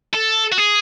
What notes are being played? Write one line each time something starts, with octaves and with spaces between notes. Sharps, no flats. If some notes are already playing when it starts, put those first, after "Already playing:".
A4
F#4
G#4